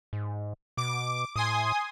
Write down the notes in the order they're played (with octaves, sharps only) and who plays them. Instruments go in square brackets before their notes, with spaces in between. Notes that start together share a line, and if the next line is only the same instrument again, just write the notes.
[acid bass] G#2
[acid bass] B2 [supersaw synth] D6
[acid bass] A2 [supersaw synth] G#5 C6 D#6